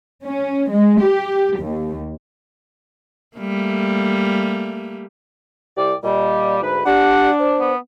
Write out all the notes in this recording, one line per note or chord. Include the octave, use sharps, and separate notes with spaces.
C#4
G#3
G4
D#2
G3 A3 A#3
C2 G4 D5
A#2 G3 D#5
D2 G#2 B4
D4 G4 F#5
C5
B3